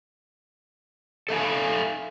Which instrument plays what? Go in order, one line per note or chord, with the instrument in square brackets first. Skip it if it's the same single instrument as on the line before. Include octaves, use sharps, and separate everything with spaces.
[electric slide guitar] A4 E5 F5 G#5